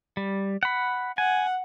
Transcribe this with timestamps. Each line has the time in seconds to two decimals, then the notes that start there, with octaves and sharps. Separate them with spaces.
0.17 G3
0.63 F#5 B5
1.18 F#5 G#5